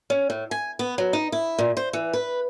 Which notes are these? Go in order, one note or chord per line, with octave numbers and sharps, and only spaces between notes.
C#4
A2
G#5
B3
F#3
D#4
E4
A#2
C5
E3
B4